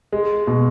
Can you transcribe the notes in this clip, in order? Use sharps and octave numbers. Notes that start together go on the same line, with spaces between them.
G#3
B2